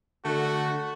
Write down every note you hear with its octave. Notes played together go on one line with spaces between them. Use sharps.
D3 A3 F#4